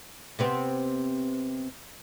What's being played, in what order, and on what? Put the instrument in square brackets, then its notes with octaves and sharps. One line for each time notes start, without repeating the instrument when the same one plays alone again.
[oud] C3 B3 C4